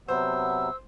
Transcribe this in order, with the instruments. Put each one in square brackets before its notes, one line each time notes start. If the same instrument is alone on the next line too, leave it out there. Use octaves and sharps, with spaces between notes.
[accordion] C3 F#3 B3 [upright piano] C5 [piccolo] E6